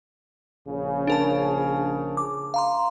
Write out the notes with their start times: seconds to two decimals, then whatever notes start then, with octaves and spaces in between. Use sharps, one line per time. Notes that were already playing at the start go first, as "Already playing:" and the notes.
0.68 A#1 C#3
1.07 D4 A#4 A5
2.17 D6
2.54 F5 A#5 C6